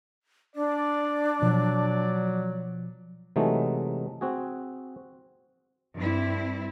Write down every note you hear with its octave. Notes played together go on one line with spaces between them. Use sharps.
D4 D5
B2 F3 F#3
C3 E3 F#3 G#3 A3 D#4
C4 F#4 G#4
G2 C4 E4